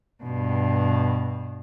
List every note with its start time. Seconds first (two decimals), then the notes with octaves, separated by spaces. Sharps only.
0.23 G2 B2